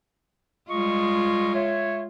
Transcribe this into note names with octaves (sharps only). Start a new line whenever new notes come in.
G3 G#3 F4 D#5 C#6
C#5 E5